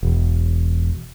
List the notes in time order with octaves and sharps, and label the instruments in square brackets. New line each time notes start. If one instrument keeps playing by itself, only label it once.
[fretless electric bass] E1